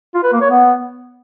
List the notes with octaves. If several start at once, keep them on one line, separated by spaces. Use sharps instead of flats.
F4
B4
A#3
C#5
B3